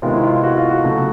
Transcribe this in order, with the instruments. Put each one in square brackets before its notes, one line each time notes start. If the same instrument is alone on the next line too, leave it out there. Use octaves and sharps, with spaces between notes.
[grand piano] C3 D#3 G#3 B3 F4
E4
F4
F#4
F4
F#4
C#3 F#3 A3